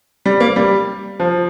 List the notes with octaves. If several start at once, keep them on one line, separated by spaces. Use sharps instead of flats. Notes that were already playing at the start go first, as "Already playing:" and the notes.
G3
A#3
G3
F3